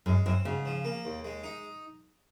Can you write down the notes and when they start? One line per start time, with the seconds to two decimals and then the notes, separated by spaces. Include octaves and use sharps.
0.06 F#2 G#3
0.26 F#2 C4
0.45 G#2 C#3
0.65 F3
0.85 A#3
1.05 D#2
1.25 G#3
1.44 D#4